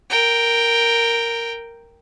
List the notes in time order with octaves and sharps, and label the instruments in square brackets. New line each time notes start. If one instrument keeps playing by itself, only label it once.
[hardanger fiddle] A#4 G5